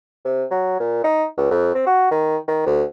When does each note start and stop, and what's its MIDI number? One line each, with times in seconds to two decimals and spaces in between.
0.25 0.45 48
0.51 0.76 54
0.80 1.01 46
1.04 1.26 63
1.37 1.48 37
1.51 1.72 41
1.75 1.86 60
1.87 2.08 66
2.11 2.37 51
2.48 2.65 51
2.66 2.84 38